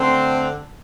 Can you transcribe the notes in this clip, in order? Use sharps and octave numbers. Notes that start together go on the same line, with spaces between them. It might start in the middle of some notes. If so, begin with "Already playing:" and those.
Already playing: D3 A3 C4